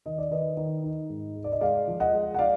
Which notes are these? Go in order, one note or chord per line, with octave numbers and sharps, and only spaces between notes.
D#3 D#5
D5
D#3 B4 D#5
D#3
D#4
G#2
G#3
D5
D#5
G#3 D5 F5
F3
D#5 F#5
G#3
F#5
D5 F5